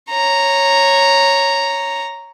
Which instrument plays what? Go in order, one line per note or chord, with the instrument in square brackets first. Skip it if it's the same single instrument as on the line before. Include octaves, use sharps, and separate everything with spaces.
[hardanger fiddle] C#5 A#5